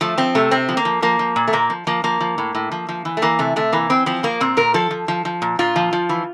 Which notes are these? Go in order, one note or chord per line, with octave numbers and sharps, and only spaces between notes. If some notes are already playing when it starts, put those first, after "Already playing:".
F3 A3
F3 C4
C3 A3
C3 C4
F3
A#3
F3
F3 A#3
F3
A#2
A3
A#2 A#3
F3
F3 A#3
F3 A#3
F3
A2
A2
F3
F3
E3
A3
E3 A#3
C3 A3
C3 A3
E3 A#3
E3 C4
F3 C4
F3 A#3
A#2 C4
A#2 A#4
F3 A4
F3
F3
F3
A#2
A#2 F4
F3
F3
E3